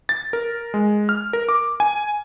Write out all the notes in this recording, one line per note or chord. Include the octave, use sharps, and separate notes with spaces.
A6
A#4
G#3
F6
A#4
D6
G#5